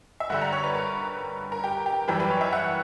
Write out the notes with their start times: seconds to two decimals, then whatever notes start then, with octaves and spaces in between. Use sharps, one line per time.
0.20 E5
0.30 G2 D3 G3 F#5
0.41 A#5
0.52 C#5
0.64 B4
0.75 A#4
1.52 A#4
1.64 G4
1.86 G4
2.08 F#2 E3 G3 G4
2.20 B4
2.30 C#5
2.41 E5
2.53 F#5